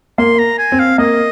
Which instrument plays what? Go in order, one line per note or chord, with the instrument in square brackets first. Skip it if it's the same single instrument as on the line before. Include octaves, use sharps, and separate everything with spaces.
[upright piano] A#3 [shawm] C6
[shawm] A#5
G#5
[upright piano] C4
[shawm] F5
[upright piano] A#3 [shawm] D#5